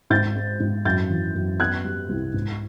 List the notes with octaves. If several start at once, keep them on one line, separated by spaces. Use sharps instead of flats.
G#2 G6 A6
G#3
G#2
F#2 G6 A6
E3
F#2
B3 F#6 G#6
G3
C2
G#2